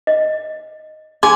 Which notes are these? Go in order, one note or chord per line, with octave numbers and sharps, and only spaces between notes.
D#5
G#4 G#5 C6 D6